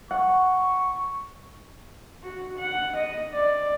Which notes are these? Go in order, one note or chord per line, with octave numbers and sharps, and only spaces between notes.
F#5 C#6
F#4
F#5
D#5
D5